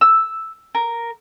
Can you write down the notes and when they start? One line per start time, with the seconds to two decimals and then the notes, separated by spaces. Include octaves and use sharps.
0.01 E6
0.75 A#4